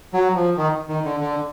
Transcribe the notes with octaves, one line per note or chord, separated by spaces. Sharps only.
F#3
F3
D#3
D#3
D3
D3